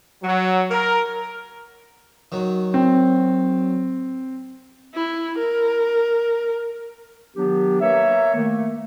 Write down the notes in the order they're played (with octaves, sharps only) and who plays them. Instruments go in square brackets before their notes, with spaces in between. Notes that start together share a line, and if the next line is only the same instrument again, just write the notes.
[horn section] F#3
A#4
[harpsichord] D#3 F#3
[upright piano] C4
[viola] E4
A#4
[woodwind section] D#3 F#3 B3 D4 G4
A#3 A#4 B4 C#5 E5
D#3 A3 A#3